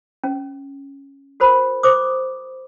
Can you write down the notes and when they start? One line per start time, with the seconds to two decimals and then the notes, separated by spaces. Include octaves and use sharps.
0.24 C#4
1.40 F#4 A#4 C5 B5
1.83 C5 D6 D#6